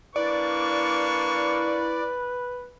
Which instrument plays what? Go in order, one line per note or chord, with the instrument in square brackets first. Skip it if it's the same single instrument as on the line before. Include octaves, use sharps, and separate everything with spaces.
[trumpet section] A#3 D4 C#6 [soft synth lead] E4 [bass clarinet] B4 [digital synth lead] D5